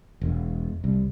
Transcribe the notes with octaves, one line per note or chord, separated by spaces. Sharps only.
E1
C2